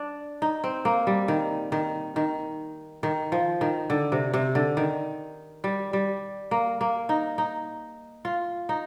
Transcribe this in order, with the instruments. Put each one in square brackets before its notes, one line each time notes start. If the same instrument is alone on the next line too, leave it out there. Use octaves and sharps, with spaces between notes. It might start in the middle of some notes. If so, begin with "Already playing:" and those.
Already playing: [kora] D4
D#4
C4
A#3
G3
D#3
D#3
D#3
D#3
F3
D#3
D3
C3
C3
D3
D#3
G3
G3
A#3
A#3
D#4
D#4
F4
D#4